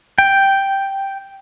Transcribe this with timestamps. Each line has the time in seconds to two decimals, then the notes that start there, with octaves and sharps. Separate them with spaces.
0.18 G5